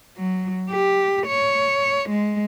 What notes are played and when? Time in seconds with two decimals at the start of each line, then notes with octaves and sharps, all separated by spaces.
0.17 F#3
0.70 G4
1.27 C#5
2.10 G#3